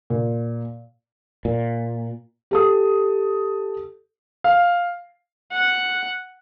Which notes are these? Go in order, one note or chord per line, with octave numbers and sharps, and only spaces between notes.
A#2
A#2
G4 A4 D#6
F5
F#5